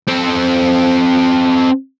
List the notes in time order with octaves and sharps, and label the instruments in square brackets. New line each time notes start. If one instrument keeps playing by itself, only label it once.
[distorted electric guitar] C4 A4